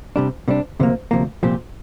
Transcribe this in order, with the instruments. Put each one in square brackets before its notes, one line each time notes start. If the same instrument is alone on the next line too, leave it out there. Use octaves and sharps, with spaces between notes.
[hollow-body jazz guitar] C3 G3 D4
C3 G3 D4
D2 C3 F3 A#3
D2 C3 F3 A#3
C2 A#2 F3 C4 G4